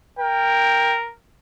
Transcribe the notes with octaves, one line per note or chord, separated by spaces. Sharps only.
A#4 G5